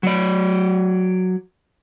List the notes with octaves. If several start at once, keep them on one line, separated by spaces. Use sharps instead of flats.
F#3 D5